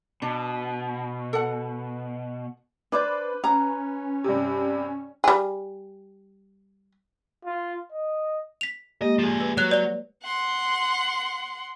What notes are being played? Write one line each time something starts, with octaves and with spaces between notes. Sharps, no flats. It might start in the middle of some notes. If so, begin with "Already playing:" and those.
B2 D4
A4 F#5
D4 B4 C5 D5
C#4 A#5
G2 C3
G3 G#4
F4
D#5
B6 F7
G#3 A#3 G4 D#5
F3 G#4
B4
F#3 C#5 F#6 F7
B4 D5 G7
F#5 C6